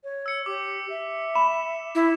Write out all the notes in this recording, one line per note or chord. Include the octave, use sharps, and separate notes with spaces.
C#5
E6 C#7
G4 D6
E5
B5 E7
E4